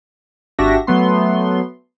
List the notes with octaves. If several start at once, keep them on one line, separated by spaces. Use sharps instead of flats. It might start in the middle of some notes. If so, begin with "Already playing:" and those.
G#1 D4 F#4 G4 E5 A#6
F#3 A3 B3 C6